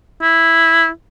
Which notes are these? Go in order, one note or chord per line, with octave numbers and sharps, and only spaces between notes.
E4